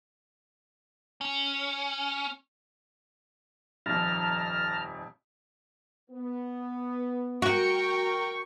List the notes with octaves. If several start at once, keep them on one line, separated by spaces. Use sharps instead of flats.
C#4
D#1 F2 A5 A#5 F6
B3
F#4 A#4 G5 C#6